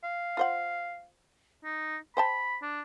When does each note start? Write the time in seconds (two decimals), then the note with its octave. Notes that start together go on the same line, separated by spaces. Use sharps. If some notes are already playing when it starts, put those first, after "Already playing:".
0.04 F5
0.37 F4 C5 F#5
1.64 D#4
2.17 C5 G5 A5 B5
2.62 D4